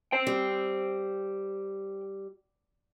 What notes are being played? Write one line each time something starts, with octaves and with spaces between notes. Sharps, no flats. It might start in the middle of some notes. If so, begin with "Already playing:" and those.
C5 G5
G3